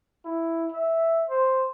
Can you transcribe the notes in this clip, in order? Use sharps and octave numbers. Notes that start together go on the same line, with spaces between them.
E4
E5
C5